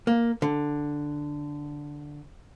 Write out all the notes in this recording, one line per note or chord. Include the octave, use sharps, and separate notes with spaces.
A#3
D3